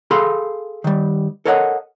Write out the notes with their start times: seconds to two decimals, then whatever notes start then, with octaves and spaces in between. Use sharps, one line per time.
0.11 G#4 A4 F5 B5 C6
0.84 D#3 G3
1.45 A4 A#4 C#5 D#5 F#5